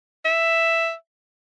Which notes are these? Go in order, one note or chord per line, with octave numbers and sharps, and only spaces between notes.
E5